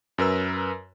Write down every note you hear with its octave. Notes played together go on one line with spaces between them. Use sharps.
F#2 A#4 B4 E6